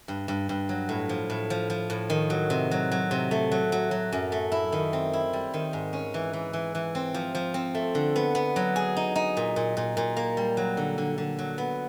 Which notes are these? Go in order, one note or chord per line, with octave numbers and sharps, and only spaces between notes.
G2
G2
G2
F#3
A2
F3
A2
F3
F3
A2
D#3
F#3
C3
F#3
F#3
C3
A3
F#3
F#3
F#3
F#2
A3
E4
D#3
C4
E4
G3
D#3
G#2
C#4
E3
E3
E3
E3
C4
F3
F3
C4
A3
D3
B3
B3
F#3
G#4
D#4
D#4
A#2
A#2
A#2
A#2
A#3
G3
F#3
D3
D3
D3
F#3
B3